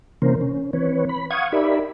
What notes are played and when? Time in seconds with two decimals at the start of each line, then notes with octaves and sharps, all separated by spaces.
0.22 C3 E3 A#3 C#4 A#4 C5
0.41 C#4
0.73 E3 C4 B4 C#5
1.09 B5
1.30 F5 F#5 C#6 D#6 G#6
1.52 D#4 G4 A#4 D5 E5 B5